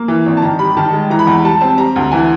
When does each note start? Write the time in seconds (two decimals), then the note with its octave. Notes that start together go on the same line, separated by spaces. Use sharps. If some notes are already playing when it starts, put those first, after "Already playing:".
Already playing: A#3
0.08 E3
0.26 G#1
0.37 A5
0.42 D#3 A#5
0.59 G3 B5
0.77 D#3 A5
0.93 G#3
1.10 E3 A#5
1.19 B5
1.27 E2 A#5
1.44 G3 A5
1.61 C4 A5
1.78 G3 A#5
1.96 D2
2.12 E3 G#5